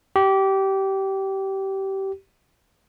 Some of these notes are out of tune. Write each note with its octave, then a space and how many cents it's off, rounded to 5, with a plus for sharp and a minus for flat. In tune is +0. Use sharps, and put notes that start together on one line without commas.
G4 -20